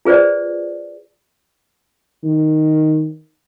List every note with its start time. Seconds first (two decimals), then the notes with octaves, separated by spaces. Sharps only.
0.05 F4 G#4 B4 C5 D5
2.24 D#3